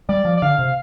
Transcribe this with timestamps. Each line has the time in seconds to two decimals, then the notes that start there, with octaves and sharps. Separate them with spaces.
0.09 G3 D5
0.25 F3
0.37 D5
0.42 D3 F5
0.59 C3